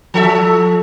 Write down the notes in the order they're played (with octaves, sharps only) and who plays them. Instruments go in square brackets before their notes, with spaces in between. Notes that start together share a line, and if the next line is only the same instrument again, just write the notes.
[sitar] F3 A4 E5